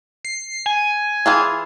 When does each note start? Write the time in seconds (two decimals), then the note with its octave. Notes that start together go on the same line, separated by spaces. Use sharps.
0.25 C7
0.66 G#5
1.26 E3 F4 G#4